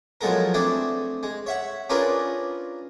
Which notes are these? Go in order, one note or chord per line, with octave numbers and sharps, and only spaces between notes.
F3 F#3 G#3 B3 A4 A#4
A3 C4 D4 G#4 C5
G#3
C#5 E5 F#5
C#4 D4 F4 G#4 A#4 B4